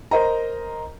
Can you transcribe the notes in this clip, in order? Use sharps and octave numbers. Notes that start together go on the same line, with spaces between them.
A#4 C5 D#5 A#5